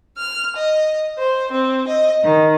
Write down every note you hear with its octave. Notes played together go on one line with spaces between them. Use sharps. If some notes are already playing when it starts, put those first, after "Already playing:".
F6
D#5
C5
C4
D#5
D#3